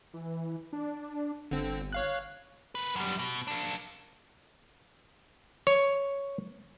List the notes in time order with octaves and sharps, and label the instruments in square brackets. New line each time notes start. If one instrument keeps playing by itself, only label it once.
[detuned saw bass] E3
D4
[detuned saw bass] G1 [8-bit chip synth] D3 C4
[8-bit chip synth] C#5 F5 F#6
[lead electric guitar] A#3 B4
F#2 G3
B2
A#3 D4
[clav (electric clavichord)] C#5